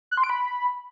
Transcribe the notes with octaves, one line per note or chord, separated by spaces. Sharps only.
F#6
C6
D7
B5